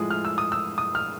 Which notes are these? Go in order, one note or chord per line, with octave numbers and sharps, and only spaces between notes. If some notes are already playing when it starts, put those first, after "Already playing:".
Already playing: A2 F3 G#3 D#6
F6
E6
D#6
E6
D#6
F6